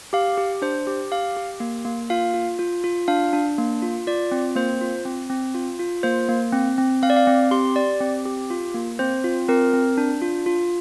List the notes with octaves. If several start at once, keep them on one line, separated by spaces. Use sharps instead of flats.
G4 F5
G4
D4 C5
G4
G4 F5
G4
A#3
A#3
F4 F5
F4
F4
F4
D4 F5
D4
A#3
F4
F4 D5
C4
A#3 C5
F4
C4
C4
F4
F4
A#3 C5
A#3
C4
C4
C4 F5
D5
F5
C4
G4 C6
G4 D5
C4
G4
F4
A#3
C4 C5
F4
C4 A#4
C4
D4
F4
F4